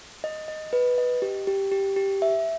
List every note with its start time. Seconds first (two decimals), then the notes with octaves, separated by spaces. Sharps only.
0.24 D#5
0.48 D#5
0.73 B4
0.98 D#5
1.22 G4
1.47 G4
1.72 G4
1.96 G4
2.22 E5